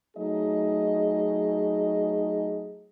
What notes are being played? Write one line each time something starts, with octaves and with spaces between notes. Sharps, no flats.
F#3 A3 D#4 G#4 D#5